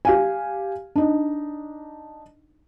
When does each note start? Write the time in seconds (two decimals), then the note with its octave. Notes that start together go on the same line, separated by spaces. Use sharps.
0.05 G4 F5 G#5
0.96 D4 D#4